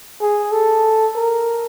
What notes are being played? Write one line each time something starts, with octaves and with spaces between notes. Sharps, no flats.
G#4
A4
A#4